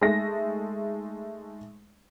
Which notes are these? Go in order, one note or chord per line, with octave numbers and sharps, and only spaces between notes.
G#3 A3 D#4 A#6